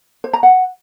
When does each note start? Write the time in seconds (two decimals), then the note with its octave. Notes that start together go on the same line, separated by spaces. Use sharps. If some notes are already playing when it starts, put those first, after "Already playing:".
0.24 C5
0.33 A#5
0.43 F#5